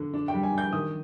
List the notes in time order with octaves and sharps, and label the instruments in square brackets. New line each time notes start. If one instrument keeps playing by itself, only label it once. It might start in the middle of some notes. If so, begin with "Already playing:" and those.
Already playing: [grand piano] D3
D4
G5
G3
G#5
D4 G6
D#3 D#6